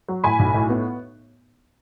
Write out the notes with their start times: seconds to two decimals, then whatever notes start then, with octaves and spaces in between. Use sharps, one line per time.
0.09 F#3
0.24 A2 G#5 B5
0.39 B1
0.54 A2
0.69 B3